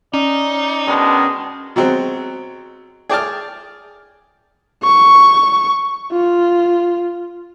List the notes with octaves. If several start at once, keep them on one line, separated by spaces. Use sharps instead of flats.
C#4 D#4 D5
B2 D#3 G#3 D4
B2 F#3 G#3 C4
G#4 D5 G5 A5 D6 F6
C#6
F4